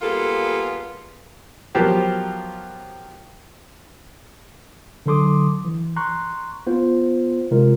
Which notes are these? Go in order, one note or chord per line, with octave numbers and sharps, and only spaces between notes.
G3 A#3 B3 F4 G#4 A4
F3 F#3 B3 G4 A#4 C5
D3 F#3 A4 C6 D6 D#6
E3
A#5 C6 C#6 F#6
B3 F4 C5
C3 G#3 F4 A#4